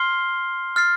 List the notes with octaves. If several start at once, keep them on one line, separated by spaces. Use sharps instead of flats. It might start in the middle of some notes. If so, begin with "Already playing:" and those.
Already playing: C6 F6 C7 G7
F6 A6 C7